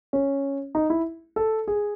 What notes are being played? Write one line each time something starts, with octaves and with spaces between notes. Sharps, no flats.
C#4
D#4
E4
A4
G#4